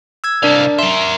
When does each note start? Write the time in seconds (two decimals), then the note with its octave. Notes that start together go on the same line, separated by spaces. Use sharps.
0.24 E6 G#6
0.43 C2 D4 A#4 D5 F5
0.79 A#4 E5 C6